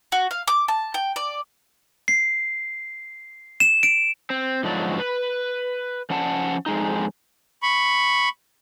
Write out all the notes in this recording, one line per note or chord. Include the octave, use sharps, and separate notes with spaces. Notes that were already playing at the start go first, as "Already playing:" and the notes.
F#4
F5
D6
A5
G5
D5
C7
E7
D7
C4
G#2 D3 F3 F#3 F#4 D5
B4
F3 C#4 F#5 A5
F2 G#3 D#4
B5 C#6